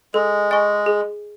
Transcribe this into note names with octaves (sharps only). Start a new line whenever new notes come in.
G#3 A4
D#5 G#5 C#6
G#4